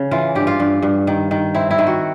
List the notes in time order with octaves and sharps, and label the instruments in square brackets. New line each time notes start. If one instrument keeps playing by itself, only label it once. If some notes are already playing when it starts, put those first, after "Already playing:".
Already playing: [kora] C#3
E3 F4
G2 G4
F4
G2
G2
D#3
D#3
C4 E4
E4
D#3
F#4